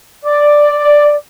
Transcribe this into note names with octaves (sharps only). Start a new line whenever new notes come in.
D5